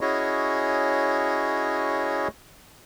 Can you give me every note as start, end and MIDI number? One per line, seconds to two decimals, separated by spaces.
0.01 2.28 61
0.01 2.28 64
0.01 2.28 66
0.01 2.28 68
0.01 2.28 73
0.01 2.28 75